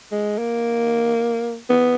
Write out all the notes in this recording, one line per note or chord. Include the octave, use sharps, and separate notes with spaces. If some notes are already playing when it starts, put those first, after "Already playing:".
G#3
A#3
B3